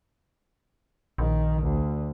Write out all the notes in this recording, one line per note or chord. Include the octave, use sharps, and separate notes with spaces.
A#1 D#3
D2